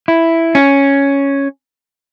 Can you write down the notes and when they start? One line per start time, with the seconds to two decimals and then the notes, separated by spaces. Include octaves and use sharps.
0.08 E4
0.55 C#4